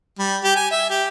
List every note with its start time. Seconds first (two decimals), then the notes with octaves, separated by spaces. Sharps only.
0.19 G3
0.44 G4
0.56 G#5
0.71 E5
0.90 G4